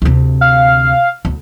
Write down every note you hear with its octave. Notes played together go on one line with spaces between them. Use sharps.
D2 C3
F5
D2